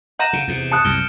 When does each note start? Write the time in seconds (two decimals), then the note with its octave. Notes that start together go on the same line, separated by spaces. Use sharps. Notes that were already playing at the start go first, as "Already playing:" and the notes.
0.19 F#5 A#5 G6 D#7 E7
0.33 C#3
0.48 E2 C3
0.72 A5 D#6 F#6 C#7
0.85 C2 F#2 F6 D7 G7